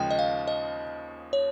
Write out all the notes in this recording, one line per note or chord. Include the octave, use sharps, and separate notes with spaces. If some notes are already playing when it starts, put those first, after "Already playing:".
Already playing: D#2 C#3 F3 G#3 G5
D#5
F5
D#5
C#5